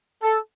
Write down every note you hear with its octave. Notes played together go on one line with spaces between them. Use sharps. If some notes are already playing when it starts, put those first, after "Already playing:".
A4